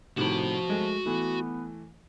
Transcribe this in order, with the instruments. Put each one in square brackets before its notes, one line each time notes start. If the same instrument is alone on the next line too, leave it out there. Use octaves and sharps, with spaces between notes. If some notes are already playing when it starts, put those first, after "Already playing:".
[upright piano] A2 C3 D#3 [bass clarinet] F3 [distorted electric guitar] F#4 B5
[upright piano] G#3 A3
[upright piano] E3 A3 [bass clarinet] B3